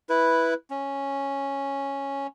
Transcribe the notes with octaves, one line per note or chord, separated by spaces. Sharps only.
E4 B4
C#4